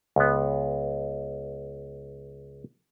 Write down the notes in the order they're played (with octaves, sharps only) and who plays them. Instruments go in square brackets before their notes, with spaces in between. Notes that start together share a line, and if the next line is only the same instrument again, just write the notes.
[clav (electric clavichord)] C#2 B3